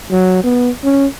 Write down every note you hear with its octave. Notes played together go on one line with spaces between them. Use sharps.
F#3
B3
C#4